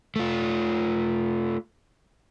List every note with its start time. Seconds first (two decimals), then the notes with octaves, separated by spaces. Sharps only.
0.16 A3 F4